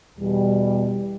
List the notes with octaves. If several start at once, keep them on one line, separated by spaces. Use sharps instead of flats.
E2 B2 G3